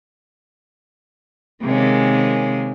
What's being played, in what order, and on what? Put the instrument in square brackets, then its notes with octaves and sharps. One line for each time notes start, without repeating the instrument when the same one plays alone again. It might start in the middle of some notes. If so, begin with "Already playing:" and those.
[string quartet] C3 D#3 G#3 A#3 C#4